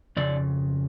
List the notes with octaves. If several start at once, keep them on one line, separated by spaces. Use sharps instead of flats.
F2 C#3 D5